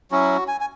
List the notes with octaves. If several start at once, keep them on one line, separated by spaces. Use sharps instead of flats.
F#3 C#4 E4 F#4
G#5
G#5